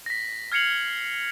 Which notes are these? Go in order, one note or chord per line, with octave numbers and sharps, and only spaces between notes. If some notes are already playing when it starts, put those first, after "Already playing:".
A#6 B6
F6 G#6 C7 C#7 F7 F#7